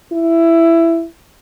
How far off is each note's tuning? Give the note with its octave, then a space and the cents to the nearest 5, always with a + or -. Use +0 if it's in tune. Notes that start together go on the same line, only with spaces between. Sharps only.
E4 +15